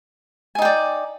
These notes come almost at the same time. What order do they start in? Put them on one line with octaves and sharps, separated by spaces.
G#5 D#4 G5 D5